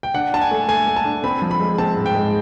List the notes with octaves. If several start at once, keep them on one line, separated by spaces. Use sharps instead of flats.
G5
D4 F#5
D4 A5
G#5
A3
A3 G#5
A3
A5
D4
C4 B5
F3
B5
G#3
C4 A5
G#2
G5
G#3